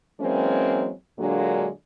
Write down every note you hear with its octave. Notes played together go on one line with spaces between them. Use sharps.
E3 F#3 G#3 A#3 C4 C#4
A#2 D3 F#3 G#3 A#3 D4